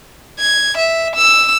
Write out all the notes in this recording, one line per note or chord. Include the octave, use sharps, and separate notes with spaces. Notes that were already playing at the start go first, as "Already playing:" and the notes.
G#6
E5
E6